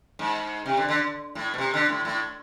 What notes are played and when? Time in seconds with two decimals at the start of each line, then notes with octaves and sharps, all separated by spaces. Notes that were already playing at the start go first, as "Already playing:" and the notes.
0.19 G#2
0.66 C3
0.77 D3
0.89 D3
1.35 A2
1.54 B2
1.58 C3
1.74 D3
1.89 A2
2.05 A2